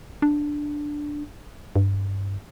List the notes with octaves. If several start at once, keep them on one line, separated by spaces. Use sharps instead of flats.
D4
G2